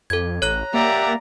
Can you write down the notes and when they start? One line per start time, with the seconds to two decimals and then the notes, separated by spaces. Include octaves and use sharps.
0.10 F2 A4 G#6
0.42 A1 C#5 A#5 F#6
0.74 A#3 G4 D5 E5 F#5 A#5